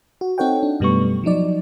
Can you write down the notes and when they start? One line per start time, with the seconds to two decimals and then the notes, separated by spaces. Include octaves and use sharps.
0.21 F#4
0.38 C4 D#4 A4 C#5 F#5 G5
0.63 D4
0.80 F#2 B2 G3 A3 B3 C#6
1.24 F3 F#3 D#4 D5